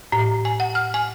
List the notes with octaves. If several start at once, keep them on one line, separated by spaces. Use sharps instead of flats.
A2
G#5
F#5
F6
G#5